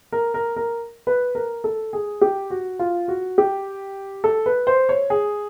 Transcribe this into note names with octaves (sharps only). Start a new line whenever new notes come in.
A#4
A#4
A#4
B4
A#4
A4
G#4
G4
F#4
F4
F#4
G4
A4
B4
C5
C#5
G#4